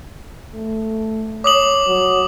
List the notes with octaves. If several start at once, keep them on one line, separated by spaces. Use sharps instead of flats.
A3
C#5 D6 D#6 F#7
F#3